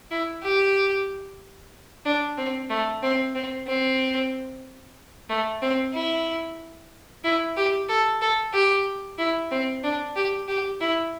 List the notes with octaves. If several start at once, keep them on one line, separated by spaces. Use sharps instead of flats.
E4
G4
D4
C4
A3
C4
C4
C4
A3
C4
E4
E4
G4
A4
A4
G4
E4
C4
D4
G4
G4
E4